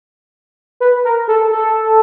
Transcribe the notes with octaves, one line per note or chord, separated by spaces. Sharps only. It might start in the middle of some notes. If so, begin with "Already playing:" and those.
B4
A#4
A4
A4